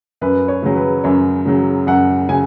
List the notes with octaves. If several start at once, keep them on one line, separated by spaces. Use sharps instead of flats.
F#2 B4
C#5
C#3 F#3
B4
F#2 C#5
C#3 F#3
F#2 F#5
C#3 G#5